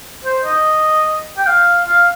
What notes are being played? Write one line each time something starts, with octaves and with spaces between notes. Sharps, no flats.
C5
D#5
G5
F5
F5